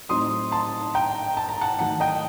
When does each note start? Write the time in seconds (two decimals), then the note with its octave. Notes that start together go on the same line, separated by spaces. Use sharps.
0.09 A2 F#3 C4 D#4 C6 D#6
0.51 A5 C6
0.94 G5 A#5
1.37 A5
1.49 A#5
1.61 F#5 A5
1.79 D#3 F#3 A3 D#4 F#5 A5
2.00 D#5 G5